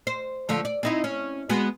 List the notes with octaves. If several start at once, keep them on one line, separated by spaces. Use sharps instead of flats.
C5
D3 F3 A3
D5
C4 D#4 E4
C#4
G#3 B3 F#4